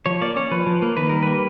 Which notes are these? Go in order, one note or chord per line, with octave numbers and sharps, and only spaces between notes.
F3 C#5
A#3 D5
C#4 C#5
F3 B4
F3
A#3
D#3 B4
G3 A#4
A#3 B4